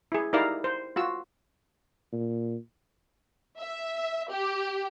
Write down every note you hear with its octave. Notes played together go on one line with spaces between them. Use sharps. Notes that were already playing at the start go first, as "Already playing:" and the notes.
E4 G#4
D#4 E4 G4 A#4 D5 F5
C5
F4 F#4 E6
A#2
E5
G4